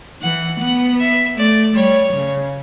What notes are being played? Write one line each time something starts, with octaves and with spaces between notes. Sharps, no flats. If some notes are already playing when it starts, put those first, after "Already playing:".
E3 F#5
B3 F#5
E5
A3 D5
G3 C#5
C#3